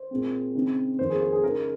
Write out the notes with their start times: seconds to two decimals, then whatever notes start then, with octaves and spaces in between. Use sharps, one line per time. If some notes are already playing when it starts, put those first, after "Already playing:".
Already playing: C5
0.11 A#2 G#3 C4
0.55 C#3 G#3 C4 D#4
0.99 F2 D#3 A#3 C5
1.10 G#4
1.21 A#4
1.32 G#4
1.44 C#3 G#3 D#4 A#4